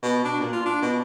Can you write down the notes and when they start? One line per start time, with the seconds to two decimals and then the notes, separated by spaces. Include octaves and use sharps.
0.03 B2
0.25 D4
0.40 A#2
0.52 F4
0.65 D4
0.82 B2